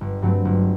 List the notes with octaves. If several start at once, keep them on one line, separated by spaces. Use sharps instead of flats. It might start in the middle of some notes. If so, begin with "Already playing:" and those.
G1
G2 F#3 A3 C4
G1